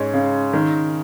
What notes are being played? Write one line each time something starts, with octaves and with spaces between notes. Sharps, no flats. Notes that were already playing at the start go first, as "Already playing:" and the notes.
Already playing: G#2 G#3 C#4
C#3
D#3